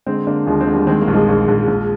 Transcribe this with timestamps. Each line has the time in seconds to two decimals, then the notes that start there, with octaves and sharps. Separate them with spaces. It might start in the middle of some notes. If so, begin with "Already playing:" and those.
0.06 D3 G#3 C4
0.27 D3 A#3 D4
0.46 D#2 F3 G#3
0.61 G#3 C4
0.68 D3
0.74 G3 A#3
0.87 D#3 G#3 C4
1.01 G3 A#3
1.08 A#1
1.14 F3 G#3
1.28 A#1
1.48 A#1
1.68 A#1